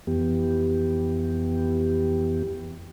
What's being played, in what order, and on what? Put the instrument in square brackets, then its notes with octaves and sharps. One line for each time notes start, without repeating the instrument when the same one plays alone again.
[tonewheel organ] F2 E3 B3 G4